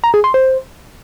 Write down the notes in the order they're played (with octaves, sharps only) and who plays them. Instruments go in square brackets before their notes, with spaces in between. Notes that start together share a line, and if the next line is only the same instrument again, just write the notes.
[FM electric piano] A#5
G#4
C6
C5